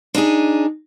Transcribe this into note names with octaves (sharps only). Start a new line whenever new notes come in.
D4 D#4 G4 G#4